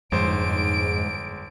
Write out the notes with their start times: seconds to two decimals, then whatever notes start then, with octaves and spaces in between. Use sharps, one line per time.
0.12 G1 F2 G#2 C5 D7